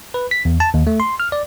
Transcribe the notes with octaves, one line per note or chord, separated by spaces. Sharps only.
B4
B6
E2
A5
D#2
A3
C6
F6
D5